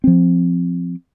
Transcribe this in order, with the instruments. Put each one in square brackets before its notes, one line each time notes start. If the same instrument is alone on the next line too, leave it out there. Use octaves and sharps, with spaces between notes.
[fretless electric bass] F3 C4